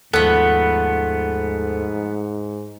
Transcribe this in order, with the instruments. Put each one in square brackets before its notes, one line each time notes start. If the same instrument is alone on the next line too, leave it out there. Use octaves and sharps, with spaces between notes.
[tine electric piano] D#2 A4 [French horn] G#2 [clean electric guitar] F3 A3 B3 [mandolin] F#5 B5